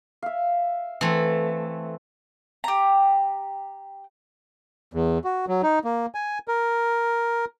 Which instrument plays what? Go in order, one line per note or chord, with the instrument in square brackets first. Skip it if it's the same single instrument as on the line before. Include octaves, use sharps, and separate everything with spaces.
[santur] E5 F5
[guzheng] E3 A3 [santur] C4 C5 E6
[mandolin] G4 A#5
[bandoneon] E2
F#4
F#3
D#4
A#3
G#5
A#4